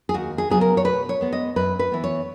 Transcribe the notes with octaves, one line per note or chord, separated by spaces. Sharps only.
G#4
D#2 F#4
G#4
C#3 F#3 B3 G#4
A#4
C#5
B2 B4
C#5
G#3 B3
D#5
F#2 B4
B4
E3 B3
C#5